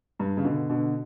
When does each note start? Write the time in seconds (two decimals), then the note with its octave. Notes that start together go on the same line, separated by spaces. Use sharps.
0.19 G2
0.37 C#3
0.44 B2 D3
0.69 B2 D3